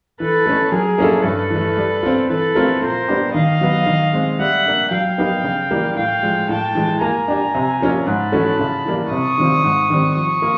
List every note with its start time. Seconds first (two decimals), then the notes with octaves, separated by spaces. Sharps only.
0.20 E3 A4 B4
0.46 A3 C#4
0.72 F#3 G#4 A#4
0.98 A#3 C#4 E4 A4
1.24 G2 A4 B4
1.51 E3
1.56 A3
1.77 G3
2.03 C4 F4
2.29 E3 A4 B4
2.55 A3 C4 F4 A#4
2.82 A#2 A#4 C5
3.08 G3 B3 D4 G4
3.34 D#3 D#5 F5
3.61 F#3 B3
3.86 D#3
4.13 G#3 C4
4.39 G3 E5 F#5
4.66 A#3 D4
4.91 F#3 F5 G5
5.18 B3 D#4 G4 A#4
5.44 C#3
5.71 E3 G3 A#3
5.96 A2 F5 G5
6.23 F3 G#3
6.49 A2 G5 A5
6.75 E3 G#3
7.01 A#3 G#5 A#5
7.28 D4 G4
7.55 C3
7.80 F3 A#3 C#4 F4
8.07 G#2 A5 B5
8.32 E3 A3 C#4 F#4
8.59 C#3
8.85 E3 G3 A#3
9.11 C3 C#6 D#6
9.38 D#3 G3 C4 F4
9.63 G#2
9.90 D#3 G3 C4
10.16 F3 C#6 D#6
10.42 A#3 F4